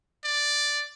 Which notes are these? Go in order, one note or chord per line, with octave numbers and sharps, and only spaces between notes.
D5